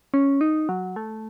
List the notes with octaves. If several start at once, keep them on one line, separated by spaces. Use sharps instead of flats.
C#4
D#4
F#3
A3